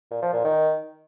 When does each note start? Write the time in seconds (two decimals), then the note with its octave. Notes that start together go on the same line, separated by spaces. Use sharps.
0.11 A#2
0.22 F3
0.33 A#2
0.44 D#3